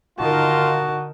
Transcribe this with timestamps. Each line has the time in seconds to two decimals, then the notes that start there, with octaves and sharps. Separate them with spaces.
0.19 D3 D#3 D#4 F4 F#4 A#4 A5